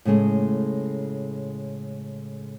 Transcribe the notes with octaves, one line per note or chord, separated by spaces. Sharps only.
A2 C#3 G#3 A3